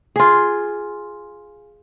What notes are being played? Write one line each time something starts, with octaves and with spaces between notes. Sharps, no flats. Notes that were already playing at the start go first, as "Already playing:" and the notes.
F4 G#4